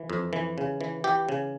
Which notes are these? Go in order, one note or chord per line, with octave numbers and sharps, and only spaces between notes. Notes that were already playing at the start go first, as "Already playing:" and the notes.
Already playing: E3
F2
E3
C#3
E3
E3 G4
C#3